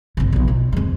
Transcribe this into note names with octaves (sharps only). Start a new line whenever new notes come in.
G#1 C3
B1 F4
B2
F2 G#3